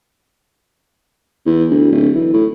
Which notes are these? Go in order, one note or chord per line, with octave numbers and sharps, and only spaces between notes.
E2
D2
D1
E3
A2